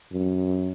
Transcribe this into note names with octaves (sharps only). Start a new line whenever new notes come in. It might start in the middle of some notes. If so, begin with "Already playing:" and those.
F#2